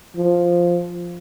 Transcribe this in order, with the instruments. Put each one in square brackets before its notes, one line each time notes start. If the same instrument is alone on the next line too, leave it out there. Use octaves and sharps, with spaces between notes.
[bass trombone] F3